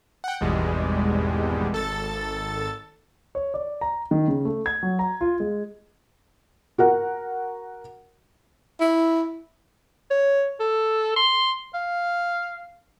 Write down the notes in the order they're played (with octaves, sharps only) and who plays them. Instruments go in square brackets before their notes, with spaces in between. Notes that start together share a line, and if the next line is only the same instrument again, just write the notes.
[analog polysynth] F#5 G5
G#1 E2 B2 G3 G#3
G#1 A4 A6
[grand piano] C#5
D5
A#5
D#3
C#3
A3
G#6
F#3
A#5
F4
G#3
[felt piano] F#4 A#4 F#5
[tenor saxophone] E4
[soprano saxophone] C#5
A4
C6
F5